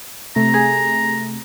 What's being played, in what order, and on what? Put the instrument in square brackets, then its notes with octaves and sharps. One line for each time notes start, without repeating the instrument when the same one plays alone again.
[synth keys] C3 A3 [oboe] A#5
[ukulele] G#4